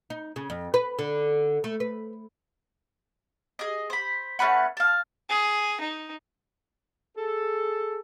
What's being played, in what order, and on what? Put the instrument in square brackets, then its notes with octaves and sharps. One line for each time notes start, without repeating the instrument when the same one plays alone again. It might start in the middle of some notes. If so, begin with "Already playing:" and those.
[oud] D#4
C#3
F2
B4
D3
A3
B4
[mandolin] G#4 D#5
C5 B5
A3 C#4 B4 F#5
F5 A5
[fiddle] G#4
D#4
[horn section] G#4 A4